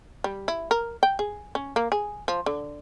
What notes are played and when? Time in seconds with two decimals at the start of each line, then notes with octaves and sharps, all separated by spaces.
0.24 G3
0.48 E4
0.71 A#4
1.03 G5
1.19 G#4
1.55 C#4
1.76 A#3
1.92 G#4
2.28 F3
2.46 D3